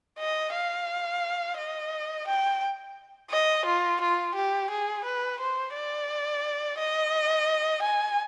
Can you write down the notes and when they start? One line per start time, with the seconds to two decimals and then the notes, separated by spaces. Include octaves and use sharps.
0.19 D#5
0.53 F5
1.57 D#5
2.27 G5
3.31 D#5
3.66 F4
4.01 F4
4.35 G4
4.70 G#4
5.04 B4
5.39 C5
5.74 D5
6.78 D#5
7.82 G#5